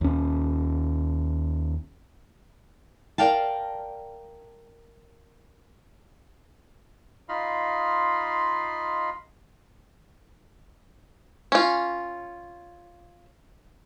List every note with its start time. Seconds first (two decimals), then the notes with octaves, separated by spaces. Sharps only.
0.01 D#2 C#4
3.18 A#4 D5 F5 G5 A5
7.29 D#4 F4 D#5 F5 B5 C6
11.52 C#4 F4